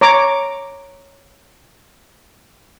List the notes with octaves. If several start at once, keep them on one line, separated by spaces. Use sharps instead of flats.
C#5 A#5 D6